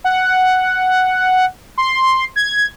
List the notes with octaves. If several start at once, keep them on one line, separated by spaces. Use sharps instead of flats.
F#5
C6
G#6